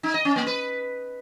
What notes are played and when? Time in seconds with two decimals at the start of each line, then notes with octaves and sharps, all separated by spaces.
0.03 D#4
0.14 D#5
0.25 C#4
0.36 A#3
0.47 B4